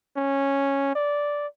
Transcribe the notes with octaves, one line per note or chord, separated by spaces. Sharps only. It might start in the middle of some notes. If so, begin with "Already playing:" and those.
C#4
D5